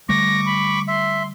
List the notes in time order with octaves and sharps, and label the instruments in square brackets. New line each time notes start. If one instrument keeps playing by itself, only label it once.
[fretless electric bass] D3 G3 A3 [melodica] C#6 D6 [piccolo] A#6
[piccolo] B5
[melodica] E5 [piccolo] C6